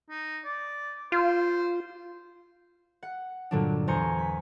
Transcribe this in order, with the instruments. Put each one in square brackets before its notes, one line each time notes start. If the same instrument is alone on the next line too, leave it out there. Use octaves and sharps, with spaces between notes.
[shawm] D#4
D5
[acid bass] F4 [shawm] C5
[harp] F#5
G2 A#2 D3 F#3 B3 D4
E2 C5 G#5 A#5 C#6 C#7
B6